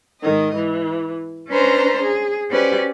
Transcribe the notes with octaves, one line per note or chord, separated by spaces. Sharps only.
G#2 D#3 D#5
E3
C#4 D4 B4 C5 A#5 C6
G#4
C#4 F#4 G4 B4 C5 D5